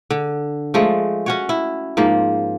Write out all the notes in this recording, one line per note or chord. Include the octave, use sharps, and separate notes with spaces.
D3
F3 G#3 A3
C#4 F#4 C#5
E4
G#2 F3 A#3